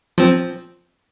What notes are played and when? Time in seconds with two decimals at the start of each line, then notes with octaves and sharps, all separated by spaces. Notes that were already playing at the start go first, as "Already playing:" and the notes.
0.18 F3 C4